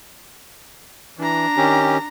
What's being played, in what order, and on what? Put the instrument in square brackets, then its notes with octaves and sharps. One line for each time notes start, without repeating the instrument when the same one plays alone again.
[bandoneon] E3 [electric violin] D4 A#5
[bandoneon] D#3 C#4 G4